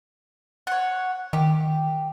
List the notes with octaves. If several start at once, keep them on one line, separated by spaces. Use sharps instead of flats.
C#5 F#5
D#3 G4